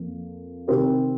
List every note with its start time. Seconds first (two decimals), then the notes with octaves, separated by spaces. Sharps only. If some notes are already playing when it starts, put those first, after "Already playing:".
Already playing: F2 F3 A#3
0.67 C3 D#3 C4 G4 A#4